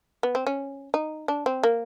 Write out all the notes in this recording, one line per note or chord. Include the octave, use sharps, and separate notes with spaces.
B3
C4
C#4
D#4
D4
C4
A#3